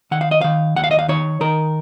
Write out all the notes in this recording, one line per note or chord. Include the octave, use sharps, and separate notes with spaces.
D#3 F#5
F5
D#5
D#3 F5
D#2 F#5
F5
D#5
F5
D#3 C#5
D#3 A#4